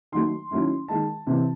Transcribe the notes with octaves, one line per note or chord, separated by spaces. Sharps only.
D#3 F#3 A3 C6
D#3 F#3 A3 C#4 E4
D#3 G#3 D#4 A5
C3 E3 C4 E4